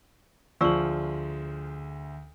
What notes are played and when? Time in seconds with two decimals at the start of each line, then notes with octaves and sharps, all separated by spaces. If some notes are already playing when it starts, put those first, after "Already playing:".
0.61 D2 F3 G#4 D5 C#6 E6 F#7